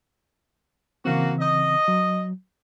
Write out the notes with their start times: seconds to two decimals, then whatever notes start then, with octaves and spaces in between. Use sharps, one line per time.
1.05 C#3 E3 A#3 C4 F#4
1.40 D#5
1.88 F#3